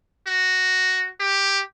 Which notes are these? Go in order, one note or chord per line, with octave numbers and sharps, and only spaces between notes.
F#4
G4